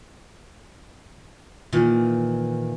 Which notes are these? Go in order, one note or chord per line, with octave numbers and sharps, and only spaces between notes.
A#2 D#3 E3